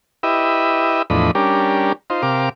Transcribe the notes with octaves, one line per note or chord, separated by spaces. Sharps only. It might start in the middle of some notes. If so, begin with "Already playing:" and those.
E4 G4 B4 D#5 E5
E2 A2 F3 D4 D#5 B5
G3 C#4 D4 G4 A#4
D#4 F4 C5
C3 G4 A#4 F5 D6